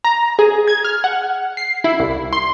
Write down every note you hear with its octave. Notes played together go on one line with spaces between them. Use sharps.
A#5
G#4
G#6
F6
F#5
C7
E4
C2
C6